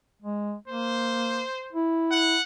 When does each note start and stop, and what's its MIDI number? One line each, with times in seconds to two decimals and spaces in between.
0.22 0.55 56
0.68 1.43 58
0.68 1.78 72
1.73 2.37 64
2.11 2.42 78